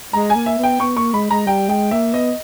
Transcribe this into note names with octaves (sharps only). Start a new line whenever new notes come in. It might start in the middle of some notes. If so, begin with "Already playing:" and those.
G#3 A#5
G#5
A#3
E5
B3
G5
B3 C#6
A#3 C#6
G#3 B5
G#3 A#5
G3 G5
G#3 G5
A#3 E5
B3 D#5